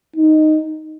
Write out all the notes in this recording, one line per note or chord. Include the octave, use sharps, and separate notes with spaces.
D#4